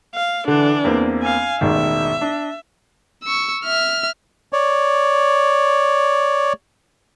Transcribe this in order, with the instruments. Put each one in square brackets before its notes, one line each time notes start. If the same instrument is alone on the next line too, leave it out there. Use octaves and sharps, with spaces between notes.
[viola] F5
[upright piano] D3 [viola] E3 D4
[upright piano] E2 A#3 C4
[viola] F5 G#5
[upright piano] E1 A1 D#3 [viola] E5
[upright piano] D4
[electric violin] C#6 E6
E5 F6
[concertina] C#5 D5